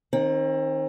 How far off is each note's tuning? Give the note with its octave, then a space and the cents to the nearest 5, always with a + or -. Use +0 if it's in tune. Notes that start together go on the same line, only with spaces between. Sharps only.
D#3 +0 C4 +35